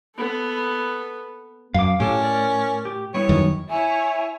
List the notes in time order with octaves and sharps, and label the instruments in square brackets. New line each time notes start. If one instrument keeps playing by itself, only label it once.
[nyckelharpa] B3 A4
[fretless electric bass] F#2 [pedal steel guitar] F5 D6
[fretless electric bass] A2 [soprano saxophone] C#4 [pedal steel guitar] G4 A4
[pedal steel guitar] A#4 D5
G4
[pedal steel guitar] G3 B3 E4 [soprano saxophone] C#5
[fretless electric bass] F#2 D#3
[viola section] E4 C#5 [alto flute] E5 [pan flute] G#5